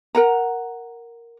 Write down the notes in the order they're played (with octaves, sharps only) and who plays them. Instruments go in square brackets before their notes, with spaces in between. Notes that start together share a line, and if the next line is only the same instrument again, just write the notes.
[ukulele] A#4 F#5 A#5